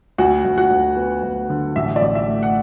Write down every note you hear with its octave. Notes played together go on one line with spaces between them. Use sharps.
D2 F#4 F#5
D2
F#4 F#5
D2
B3
D2
D3
A1 E5
D5
A1
E5
A3
F#5